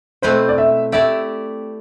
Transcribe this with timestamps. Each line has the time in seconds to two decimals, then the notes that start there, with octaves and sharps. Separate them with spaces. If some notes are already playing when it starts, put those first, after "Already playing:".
0.22 B2 A3 C4 E4 B4 C5
0.49 D5
0.58 E5
0.92 A3 E4 G4 D5 E5